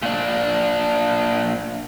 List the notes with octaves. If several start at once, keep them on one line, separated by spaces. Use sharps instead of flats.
A#2 D4